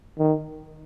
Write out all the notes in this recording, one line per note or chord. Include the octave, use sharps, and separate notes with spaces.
D#3